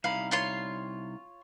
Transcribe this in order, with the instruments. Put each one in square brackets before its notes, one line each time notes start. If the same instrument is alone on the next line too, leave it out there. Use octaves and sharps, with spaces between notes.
[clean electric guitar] C2 D#4 B5 [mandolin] F5
[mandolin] F4 C#5 C6